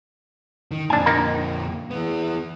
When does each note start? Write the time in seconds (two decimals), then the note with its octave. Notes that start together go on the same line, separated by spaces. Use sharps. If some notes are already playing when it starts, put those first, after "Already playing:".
0.71 D#3
0.90 F2 A#2 D4 G#5
1.06 A#3 D#4
1.91 E3 B3